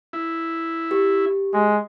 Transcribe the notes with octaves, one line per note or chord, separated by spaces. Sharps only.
E4
G4
G#3